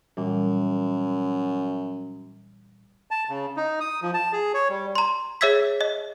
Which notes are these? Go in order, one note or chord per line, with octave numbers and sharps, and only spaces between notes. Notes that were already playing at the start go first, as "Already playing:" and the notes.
F#2 A#2 E3 G3
A5
C#3
D#4
D#6
F3
A5
G#4
C#5
G3
A#5 C6
G#4 C#5 E5 E6 G#6 B6
D#5